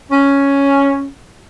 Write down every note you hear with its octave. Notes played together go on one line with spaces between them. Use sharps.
C#4